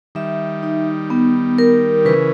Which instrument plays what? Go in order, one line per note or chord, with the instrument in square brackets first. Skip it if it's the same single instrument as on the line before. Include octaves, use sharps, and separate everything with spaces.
[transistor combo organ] D#3 G3 [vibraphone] E5
[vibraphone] D#4
B3
A#4
[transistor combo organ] C#3 E3 [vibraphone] B4